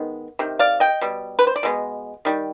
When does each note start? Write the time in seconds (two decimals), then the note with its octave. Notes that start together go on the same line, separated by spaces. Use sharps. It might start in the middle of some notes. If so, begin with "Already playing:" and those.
Already playing: D#3 G#3 B3
0.39 C3 D#3
0.59 D5 F5
0.80 D#5 G5
1.01 B2 G3
1.39 B4
1.47 C5
1.56 D5
1.63 B2 G#3 B3
2.25 D#3 G3